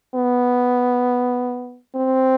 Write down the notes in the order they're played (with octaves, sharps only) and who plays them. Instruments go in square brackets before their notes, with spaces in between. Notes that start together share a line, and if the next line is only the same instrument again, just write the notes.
[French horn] B3
C4